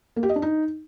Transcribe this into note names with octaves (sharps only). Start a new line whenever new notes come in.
A#3
G4
D#5
D4
D#4